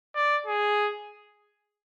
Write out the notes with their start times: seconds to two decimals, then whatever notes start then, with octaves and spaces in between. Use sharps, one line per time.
0.16 D5
0.47 G#4